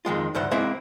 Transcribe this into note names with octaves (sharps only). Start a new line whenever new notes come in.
F2 D#3 G#3 F4
D2 G2 C5 F#5
G#3 A#3 C4 E4 E5 F5